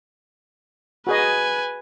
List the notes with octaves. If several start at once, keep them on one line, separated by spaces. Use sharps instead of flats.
F#4 G#4 B4 D#5 G#5